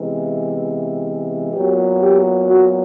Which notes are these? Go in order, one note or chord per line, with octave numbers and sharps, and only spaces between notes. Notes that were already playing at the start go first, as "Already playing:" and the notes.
Already playing: C3 E3 G#3 B3
A#2 F#3 B3 G4
G4
F#4